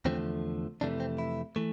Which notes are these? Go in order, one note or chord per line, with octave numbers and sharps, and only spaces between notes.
E2 D3 F3 A3 C4
F2 C3 E3 A3 D4
C4
E4
E3 A3